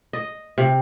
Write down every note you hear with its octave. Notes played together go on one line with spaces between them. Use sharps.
D#5
C3